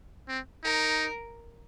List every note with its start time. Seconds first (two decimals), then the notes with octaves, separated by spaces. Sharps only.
0.28 C4
0.64 D#4 A#4